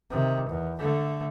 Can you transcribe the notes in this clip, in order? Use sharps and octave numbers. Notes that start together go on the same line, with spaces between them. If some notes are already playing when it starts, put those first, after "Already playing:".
C3 D#3
E2
D3 A3